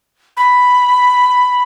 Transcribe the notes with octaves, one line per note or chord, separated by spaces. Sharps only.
B5